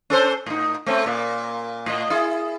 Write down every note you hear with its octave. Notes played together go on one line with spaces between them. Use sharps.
C#4 A4 C5
A2 D#4
A3 C4 C#4
A#2 A#3
A2 D#5
E4 G#4